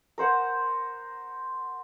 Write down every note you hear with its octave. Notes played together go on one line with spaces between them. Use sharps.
A#4 C5 F#5